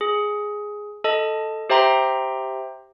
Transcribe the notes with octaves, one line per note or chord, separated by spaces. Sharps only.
G#4
A4 D#5 A5
G4 C5 E5 G5 A#5 C6